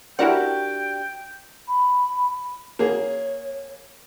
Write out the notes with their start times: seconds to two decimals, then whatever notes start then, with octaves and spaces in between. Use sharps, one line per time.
0.19 D4 E4 F#4 G4 A#4 F#5 G5
1.67 B5
2.79 A#3 G#4 C#5